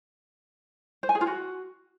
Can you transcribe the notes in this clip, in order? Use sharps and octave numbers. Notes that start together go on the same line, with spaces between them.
C5
G#5
G#4
F4
F#4